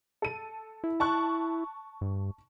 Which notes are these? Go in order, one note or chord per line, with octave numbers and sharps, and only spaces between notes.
A4 D#7
E4
A5 C#6 F#6
G2